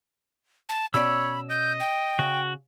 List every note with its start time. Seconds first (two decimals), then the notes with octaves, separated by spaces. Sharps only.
0.69 A5
0.94 B2 C#4 C#5 D5 B5 E6
1.50 D#5 G6
1.80 G5
2.19 C#3 F#4